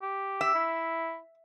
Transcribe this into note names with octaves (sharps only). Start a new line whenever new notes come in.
G4
E5
E4